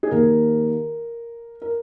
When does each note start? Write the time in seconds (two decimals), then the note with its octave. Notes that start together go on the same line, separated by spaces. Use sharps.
0.03 G#4
0.11 D#2 D#3 A#3 A#4
1.62 A#4